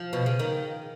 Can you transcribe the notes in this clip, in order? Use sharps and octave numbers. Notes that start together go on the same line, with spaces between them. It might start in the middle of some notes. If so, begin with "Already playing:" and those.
Already playing: F3
B2
C#3
D#3